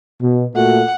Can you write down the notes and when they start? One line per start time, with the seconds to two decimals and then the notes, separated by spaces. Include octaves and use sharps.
0.22 B2
0.56 A#2 A3 F#4 F#5